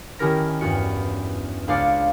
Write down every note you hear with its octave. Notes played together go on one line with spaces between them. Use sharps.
D#3 C#4 E4 G4 A#4 A#6
E2 G2 F#4 F#6 C#7
C#2 D4 F5 D6 A6 C#7